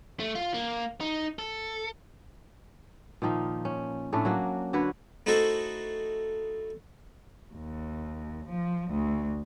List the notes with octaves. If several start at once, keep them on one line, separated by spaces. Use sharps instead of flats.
A3
F4
A#3
D#4
A4
A#2 D#3 F3 D#4
C#4
A2 A3 C#4 D4
F#3 A#3 F#4
D3 F#4 B4 C#5
A3 D#4 E4 F#4 A4 C5
D#2
F3
D2